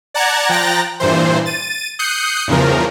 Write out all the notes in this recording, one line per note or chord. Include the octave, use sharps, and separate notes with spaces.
D5 F#5 A5 A#5 F#6 G#6
F3 G5 A#5 F#6 A6 A#6
G2 A#2 E3 C5
A6 D#7
D#6 F#6 G6 C7 C#7
E2 G2 C#3 F3 A#4